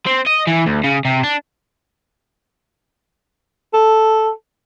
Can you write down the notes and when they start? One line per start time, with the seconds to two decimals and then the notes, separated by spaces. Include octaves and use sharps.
0.06 C4
0.26 D#5
0.47 E3
0.66 D2
0.84 C#3
1.05 C3
1.23 D4
3.74 A4